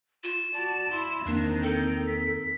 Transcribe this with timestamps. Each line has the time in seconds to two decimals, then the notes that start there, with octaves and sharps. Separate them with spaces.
0.24 F4 E7
0.54 F#4 D5 A5
0.91 E4 C6
1.26 E2 D#3 A#3 C4 D4
1.63 A4 G5
2.07 B6